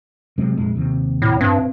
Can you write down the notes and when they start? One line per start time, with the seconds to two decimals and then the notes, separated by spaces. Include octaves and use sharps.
0.38 F#2 C3 G#3
0.57 A#1 F2 G#3
0.75 D#2 C3
1.22 A2
1.41 G2 C4